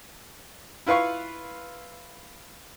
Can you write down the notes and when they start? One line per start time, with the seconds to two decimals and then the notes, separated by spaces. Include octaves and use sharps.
0.87 E4 F4 B4 F5 C#6